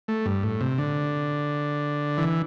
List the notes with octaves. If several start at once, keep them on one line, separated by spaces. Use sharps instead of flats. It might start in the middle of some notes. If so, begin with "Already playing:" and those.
A3
G2
A2
C3
D3
E3